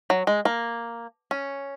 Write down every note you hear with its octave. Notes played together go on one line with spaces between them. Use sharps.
F#3
G#3
A#3
C#4